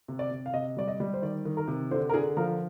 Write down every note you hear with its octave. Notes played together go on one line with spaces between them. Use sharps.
C3
D5
C3
F5
C3 D#5
G3 D5
D#5
G3
C5
D#3 D5
D#3
A#4
C3
D3 C5
A#4
D3 G#4
F3 A#4